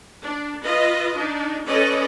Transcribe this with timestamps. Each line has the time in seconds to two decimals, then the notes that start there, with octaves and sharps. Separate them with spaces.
0.24 D4
0.63 F4 B4 D#5
1.17 D4 D#4
1.66 C#4 A4 B4 D5 D#5